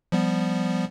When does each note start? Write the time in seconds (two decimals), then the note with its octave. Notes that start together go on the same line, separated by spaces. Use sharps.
0.12 F3 G3 B3